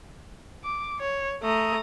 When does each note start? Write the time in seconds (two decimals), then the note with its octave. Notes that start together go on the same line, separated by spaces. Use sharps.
0.64 D6
1.00 C#5
1.43 A3 A#5 D#6